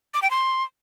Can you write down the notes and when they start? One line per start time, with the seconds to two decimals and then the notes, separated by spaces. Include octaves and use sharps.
0.14 D6
0.22 G5
0.31 C6